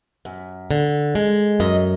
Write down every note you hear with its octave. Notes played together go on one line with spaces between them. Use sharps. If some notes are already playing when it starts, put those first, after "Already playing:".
F#2
D3
G#3
F#2 D#5